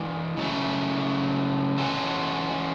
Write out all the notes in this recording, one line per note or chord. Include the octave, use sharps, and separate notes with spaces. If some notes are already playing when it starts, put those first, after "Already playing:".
Already playing: E3 G#3 D4 G#4
C#3 F#3 A3
E3 G#3 C#4 F#4 A4